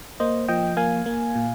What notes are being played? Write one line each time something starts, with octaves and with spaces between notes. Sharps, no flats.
A#3 C5 D#5
F3 D#5 G5
A#3 F5 G#5
A#3
A#2